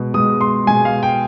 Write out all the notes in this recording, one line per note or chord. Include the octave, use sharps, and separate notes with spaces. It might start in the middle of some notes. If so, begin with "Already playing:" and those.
Already playing: B2 G#3
B2 G#3 D#6
C6
B2 G#3 G#5
F5
G5